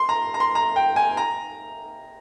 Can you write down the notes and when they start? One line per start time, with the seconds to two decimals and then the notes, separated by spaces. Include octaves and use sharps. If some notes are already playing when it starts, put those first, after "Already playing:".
Already playing: C6
0.09 A#5
0.34 A#5
0.40 C6
0.55 A#5
0.76 G5
0.96 G#5
1.17 A#5